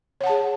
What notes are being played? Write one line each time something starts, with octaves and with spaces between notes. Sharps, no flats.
G#4 C#5 F#5 A5